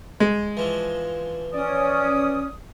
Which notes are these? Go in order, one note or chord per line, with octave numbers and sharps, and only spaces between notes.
G#3
E3 F3
C#4 D5 D#6